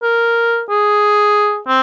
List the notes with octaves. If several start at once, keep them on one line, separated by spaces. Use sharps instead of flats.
A#4
G#4
C4